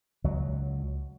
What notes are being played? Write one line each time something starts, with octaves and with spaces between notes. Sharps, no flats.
C#2 F#3